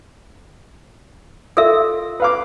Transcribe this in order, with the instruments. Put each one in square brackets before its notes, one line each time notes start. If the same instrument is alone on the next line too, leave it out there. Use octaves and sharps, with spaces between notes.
[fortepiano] F4 [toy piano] A4 A#4 E5
[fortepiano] B4 F5 D6